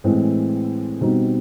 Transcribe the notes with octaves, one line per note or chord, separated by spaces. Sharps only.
A2 E3 G#3 C4
B2 G3 C4 D#4